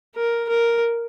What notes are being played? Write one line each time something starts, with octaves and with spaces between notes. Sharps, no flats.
A#4
A#4